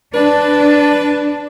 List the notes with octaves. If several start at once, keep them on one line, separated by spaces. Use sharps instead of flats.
D4 B4